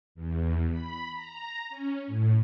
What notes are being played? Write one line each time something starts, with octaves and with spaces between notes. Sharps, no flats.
E2
B5
A#5
C#4
A2